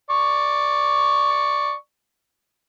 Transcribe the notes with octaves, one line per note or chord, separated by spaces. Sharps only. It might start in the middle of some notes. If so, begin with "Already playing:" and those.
D5 C#6